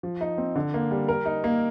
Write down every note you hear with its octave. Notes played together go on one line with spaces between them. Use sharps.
F3
D#4
C4
D3
A#3
G3
A#4
D#4
A#3